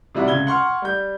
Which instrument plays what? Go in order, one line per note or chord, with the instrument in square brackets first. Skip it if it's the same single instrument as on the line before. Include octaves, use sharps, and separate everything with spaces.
[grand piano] C3 G3 E4 F#4
C#2 G#6 G7
F#5 C6 C#6 F6
G3 G6